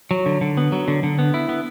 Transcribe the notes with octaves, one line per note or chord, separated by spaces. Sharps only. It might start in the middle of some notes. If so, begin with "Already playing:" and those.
F#3
D3
D3
B3
F#3
D3
D3
B3
E4
B3